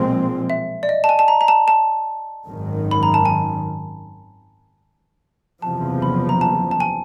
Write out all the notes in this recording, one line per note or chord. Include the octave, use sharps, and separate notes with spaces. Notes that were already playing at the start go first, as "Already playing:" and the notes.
Already playing: B1 A#2 F3 G#3 C4
E5
D5
D#5
A5
G#5
A5
A#5
A#5
A5
A5
G#1 F#2 D#3
B5
A#5
A5
G#5
F#1 E2 C3 F3 A5
B5
A#5
A5
A5
G#5